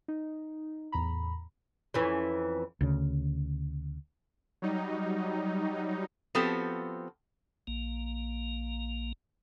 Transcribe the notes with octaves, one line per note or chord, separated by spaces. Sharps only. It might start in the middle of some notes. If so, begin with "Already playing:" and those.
D#4
E2 A2 A#5 B5
F2 E3 C#4
D2 C#3
F#3 G3 D#4
F3 B3 C4 F#4 G4 A4
A#1 A#3